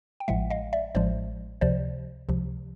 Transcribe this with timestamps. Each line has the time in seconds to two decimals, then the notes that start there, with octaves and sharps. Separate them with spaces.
0.20 G5
0.28 A1 A2 F3 G#3 E5 F#5
0.50 D#5 F5
0.73 D5 E5
0.95 A1 A2 F3 G#3 C5 D5
1.61 C#2 C3 F3 C5 D5
2.29 C#2 C3 F3